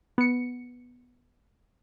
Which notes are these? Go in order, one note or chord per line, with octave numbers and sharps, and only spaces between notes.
B3 C#7